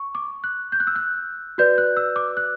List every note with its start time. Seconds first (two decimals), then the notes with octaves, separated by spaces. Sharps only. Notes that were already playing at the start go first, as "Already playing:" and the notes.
Already playing: C#6
0.15 D6
0.44 F#6
0.72 G6
0.80 F#6
0.87 E6
0.96 F#6
1.58 F#4 B4 D5 G6
1.78 F#6
1.97 E6
2.16 D6
2.37 F#6